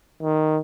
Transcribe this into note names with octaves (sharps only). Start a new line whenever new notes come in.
D#3